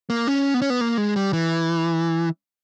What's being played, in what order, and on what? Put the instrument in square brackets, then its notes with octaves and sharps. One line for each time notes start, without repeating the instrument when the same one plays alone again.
[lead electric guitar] A#3
C#4
B3
C#4
B3
A#3
G#3
G3
E3